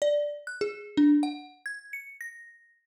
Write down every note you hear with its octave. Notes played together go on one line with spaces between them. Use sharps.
D5
F#6
G#4
D4
F#5
G#6
C#7
A#6